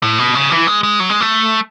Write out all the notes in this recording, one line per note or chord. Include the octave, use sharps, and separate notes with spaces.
A2
B2
C#3
E3
G#3
G#3
F#3
G#3
A3